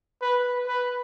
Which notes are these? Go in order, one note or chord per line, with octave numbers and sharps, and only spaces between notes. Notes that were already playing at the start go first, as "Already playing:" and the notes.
B4
B4